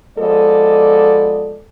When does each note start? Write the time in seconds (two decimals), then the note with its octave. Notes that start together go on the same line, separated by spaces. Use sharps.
0.18 F3 G#3 B3 A4 D5 D#5